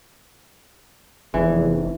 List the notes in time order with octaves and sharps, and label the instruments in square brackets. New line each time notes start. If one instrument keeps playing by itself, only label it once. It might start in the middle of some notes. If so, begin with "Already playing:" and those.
[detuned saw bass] F1 [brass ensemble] E2 [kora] E3